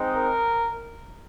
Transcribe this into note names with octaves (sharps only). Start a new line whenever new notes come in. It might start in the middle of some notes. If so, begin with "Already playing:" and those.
Already playing: G#3 C4 D#4
A#4